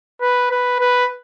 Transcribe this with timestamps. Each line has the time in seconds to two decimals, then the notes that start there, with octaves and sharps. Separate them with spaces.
0.22 B4
0.51 B4
0.80 B4